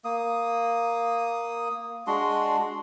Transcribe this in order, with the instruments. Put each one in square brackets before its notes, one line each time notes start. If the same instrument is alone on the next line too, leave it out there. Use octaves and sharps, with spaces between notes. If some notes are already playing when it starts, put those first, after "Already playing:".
[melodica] A#3 D#6
G#3 D4 F#4 C6